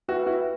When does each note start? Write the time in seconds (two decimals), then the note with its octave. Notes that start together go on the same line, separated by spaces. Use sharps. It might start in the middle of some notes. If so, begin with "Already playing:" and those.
0.08 E4 F#4 B4 E5 G5
0.27 E4 F#4